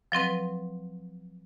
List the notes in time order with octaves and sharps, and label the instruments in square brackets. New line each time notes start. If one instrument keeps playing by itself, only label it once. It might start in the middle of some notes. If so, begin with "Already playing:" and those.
[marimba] F3 F#3 C4 B4